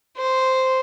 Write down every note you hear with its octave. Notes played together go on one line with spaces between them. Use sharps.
C5